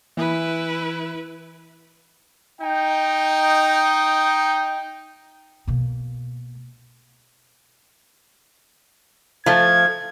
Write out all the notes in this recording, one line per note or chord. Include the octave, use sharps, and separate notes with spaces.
E3 E4 B4
D#4 G5
B2 A#3
F3 A3 G#6